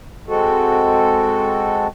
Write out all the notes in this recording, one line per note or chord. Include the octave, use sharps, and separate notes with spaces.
G#3 C4 F#4 A4